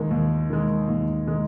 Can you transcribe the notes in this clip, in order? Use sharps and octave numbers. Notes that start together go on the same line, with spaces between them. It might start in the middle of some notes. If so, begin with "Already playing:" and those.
Already playing: D#2 D#3 G#3
D#2
D#3 G#3
D#2
D#3 G#3